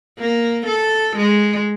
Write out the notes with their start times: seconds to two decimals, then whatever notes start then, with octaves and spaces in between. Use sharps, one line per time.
0.19 A#3
0.67 A4
1.17 G#3